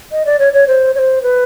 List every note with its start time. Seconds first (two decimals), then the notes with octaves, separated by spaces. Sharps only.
0.12 D#5
0.25 D5
0.39 C#5
0.53 C#5
0.67 C5
0.95 C#5
0.99 C5
1.22 B4